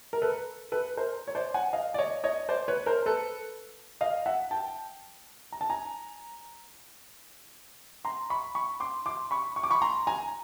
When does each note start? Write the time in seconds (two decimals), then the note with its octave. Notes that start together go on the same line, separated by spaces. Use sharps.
0.13 A#4
0.22 A4 B4
0.72 A4 B4
0.97 A#4 C5
1.28 C#5
1.35 C5 D5
1.54 F#5 G#5
1.73 D#5 F5
1.94 D5
1.98 C#5 D#5
2.24 C#5 D#5
2.49 C5 D5
2.68 B4 C#5
2.86 A#4 C5
3.06 A4 B4
4.01 D#5 F5
4.26 E5 F#5
4.51 G5 A5
5.52 A#5
5.61 A5
5.69 G#5 A#5
8.05 A#5 C6
8.30 B5 C#6
8.55 B5 C#6
8.80 C6 D6
9.06 C6 D6
9.31 B5 C#6
9.56 C#6
9.63 D6
9.71 B5 C#6
9.82 A#5 C6
10.07 G#5 A#5